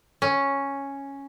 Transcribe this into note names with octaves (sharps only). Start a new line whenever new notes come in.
C#4